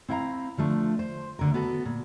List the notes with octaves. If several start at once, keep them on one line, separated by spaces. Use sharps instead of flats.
C4 E4 F5 G5 A#5
D3 F3 A3 D4
C5
D2 D3 A#4
B3 F#4 A4
A#2